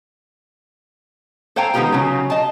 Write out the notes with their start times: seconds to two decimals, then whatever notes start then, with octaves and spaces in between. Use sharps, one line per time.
1.56 A4 C5 F5 G5 G#5 A#5
1.74 D#3 G#3 B3 F4 G4 A#5
1.92 C#3 F#3
2.30 D#5 A5